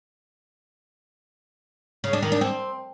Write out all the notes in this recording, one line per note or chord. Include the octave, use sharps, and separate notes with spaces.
C#3
D4
D#3
D4
C4